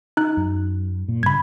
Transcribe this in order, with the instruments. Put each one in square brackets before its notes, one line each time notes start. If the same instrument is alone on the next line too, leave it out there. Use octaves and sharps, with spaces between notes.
[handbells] D#4 F#6
[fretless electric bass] F#2
A#2
[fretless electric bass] G2 C#3 [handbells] B5 G#6